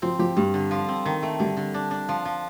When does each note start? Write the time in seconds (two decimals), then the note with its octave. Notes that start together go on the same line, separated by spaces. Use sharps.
0.02 F3 C4
0.19 F3 G4
0.37 G2 G3
0.54 D3
0.71 F3
0.88 C4
1.05 D#3
1.22 A3
1.40 D3 G3
1.57 D3
1.74 D4
1.91 D4
2.09 F3
2.25 F3